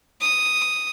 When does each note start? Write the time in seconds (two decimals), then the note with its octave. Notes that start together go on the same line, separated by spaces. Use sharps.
0.21 D#6